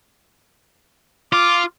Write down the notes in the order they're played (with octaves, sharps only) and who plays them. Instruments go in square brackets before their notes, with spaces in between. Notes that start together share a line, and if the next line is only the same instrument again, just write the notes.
[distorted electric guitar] F4 [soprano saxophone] D6